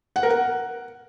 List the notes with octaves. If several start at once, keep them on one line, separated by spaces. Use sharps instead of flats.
F#5
A#4
F#5